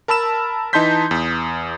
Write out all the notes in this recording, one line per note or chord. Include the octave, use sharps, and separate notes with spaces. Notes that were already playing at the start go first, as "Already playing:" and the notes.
A#4 A5 B5 E6 E7
E3 D#4 A5 C6 G6 B6
E2